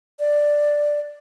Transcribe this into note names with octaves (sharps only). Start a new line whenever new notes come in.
D5